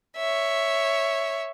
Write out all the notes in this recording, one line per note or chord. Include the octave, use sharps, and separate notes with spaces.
C#5 E5